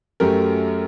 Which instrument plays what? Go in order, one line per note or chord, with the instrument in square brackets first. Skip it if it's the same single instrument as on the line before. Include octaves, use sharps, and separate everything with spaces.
[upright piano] F#2 F#3 A3 G4 A#4